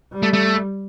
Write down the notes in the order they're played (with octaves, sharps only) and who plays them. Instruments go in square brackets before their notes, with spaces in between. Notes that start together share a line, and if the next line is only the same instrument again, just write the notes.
[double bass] G3
[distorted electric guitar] A3
A3